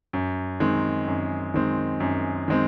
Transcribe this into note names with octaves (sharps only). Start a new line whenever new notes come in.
F#2
D#3 G#3 C4
F#2
D#3 G#3 C4
F#2
D#3 G#3 C4